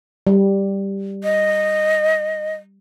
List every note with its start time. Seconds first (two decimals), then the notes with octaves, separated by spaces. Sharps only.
0.27 G3
1.24 D#5